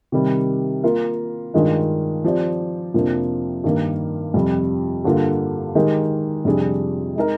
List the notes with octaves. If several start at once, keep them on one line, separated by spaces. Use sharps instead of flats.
C3 D#3 G3
A#3 F4 A#4
G2 D#3 G#3 D4 F4
F3 C4 G4 D5
F2 C3 F3 A#3 D4
G2 D#3 A#3
F2 C3 G3
G2 D3 G3 A#3 F4
D#3 G#3 D#4 G4 A#4
F2 C3 G3 D4 G#4
G#3 D#4 A#4